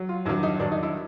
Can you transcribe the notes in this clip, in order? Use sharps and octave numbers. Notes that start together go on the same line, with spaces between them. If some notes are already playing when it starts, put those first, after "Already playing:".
Already playing: F#3
F4
G2 D#3 F#3 E4
D#4
G2 D#3 F#3 D4
D#4
E4